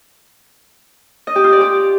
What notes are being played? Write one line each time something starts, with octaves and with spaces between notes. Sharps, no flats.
D#5
G4
F4
D5
G4